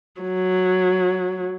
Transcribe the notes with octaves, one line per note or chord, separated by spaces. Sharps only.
F#3